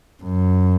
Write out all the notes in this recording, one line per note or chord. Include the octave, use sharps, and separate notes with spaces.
F#2